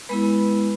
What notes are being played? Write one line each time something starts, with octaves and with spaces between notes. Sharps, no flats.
G#3 B3 E4 B4 B5